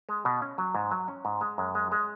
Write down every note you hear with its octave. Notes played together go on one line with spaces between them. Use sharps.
G#3
B2
C#4
F#3
G#2
F#3
C#4
G#2
G#3
F#2
G#3
G#3